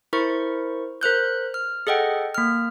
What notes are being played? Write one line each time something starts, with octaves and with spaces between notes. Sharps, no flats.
E4 A#4 C5 C#6
A#4 C5 F#6 G6
F6
G#4 A4 D#5 F#5 G5
A#3 F6